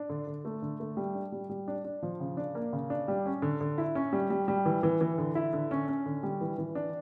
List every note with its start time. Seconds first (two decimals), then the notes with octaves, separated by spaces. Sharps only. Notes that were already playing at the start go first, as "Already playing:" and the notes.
Already playing: D4
0.09 D3
0.27 D3
0.45 A3
0.62 D3
0.80 A3
0.97 G3
1.15 D4
1.32 G3
1.50 G3
1.68 D4
1.85 D4
2.03 F3
2.20 C#3
2.37 D4
2.55 A#3
2.73 C#3
2.90 D4
3.08 G3
3.26 C#4
3.42 D3
3.61 D3
3.78 E4
3.95 C#4
4.13 G3
4.30 G3
4.48 G3
4.66 E3
4.83 E3
5.01 E3
5.18 D3
5.35 E4
5.53 D3
5.71 C#4
5.88 C#4
6.06 D3
6.23 G3
6.41 E3
6.58 E3
6.75 D4